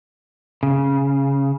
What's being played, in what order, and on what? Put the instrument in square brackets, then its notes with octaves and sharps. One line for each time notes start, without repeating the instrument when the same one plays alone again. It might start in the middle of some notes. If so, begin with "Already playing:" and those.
[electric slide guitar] C#3